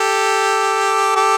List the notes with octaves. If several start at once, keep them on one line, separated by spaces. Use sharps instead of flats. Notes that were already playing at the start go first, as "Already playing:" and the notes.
Already playing: G4 A4
G4 A4